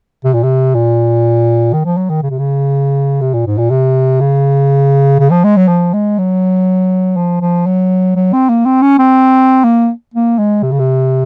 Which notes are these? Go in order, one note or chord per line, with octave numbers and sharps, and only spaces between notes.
C3
A#2
C3
A#2
D#3
F3
F#3
D#3
C#3
C3
C#3
C3
A#2
G#2
A#2
C3
C#3
C#3
F3
G#3
F#3
F3
G#3
F#3
F3
F3
F#3
F#3
C4
A#3
C4
C#4
C4
A#3
A#3
G#3
C3
C#3
C3